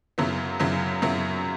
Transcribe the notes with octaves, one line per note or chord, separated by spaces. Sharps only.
F#2 C#3 F#3 B3 E4
F#2 C#3 F#3 B3 E4
F#2 C#3 F#3 B3 E4